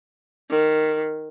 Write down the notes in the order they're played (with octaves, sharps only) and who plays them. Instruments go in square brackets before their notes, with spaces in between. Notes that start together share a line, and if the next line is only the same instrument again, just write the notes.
[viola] D#3